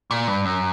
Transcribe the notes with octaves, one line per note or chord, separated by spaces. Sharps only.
A#2
G2
F#2